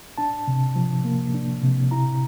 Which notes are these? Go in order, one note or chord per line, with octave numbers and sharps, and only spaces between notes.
D4 A5
C3
F3
A#3
D4
C3
E4 A#5